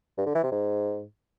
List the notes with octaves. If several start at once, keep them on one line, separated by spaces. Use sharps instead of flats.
G2
D3
E3
C3
G#2